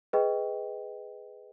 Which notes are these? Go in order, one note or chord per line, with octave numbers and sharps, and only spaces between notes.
G#4 B4 D#5 G5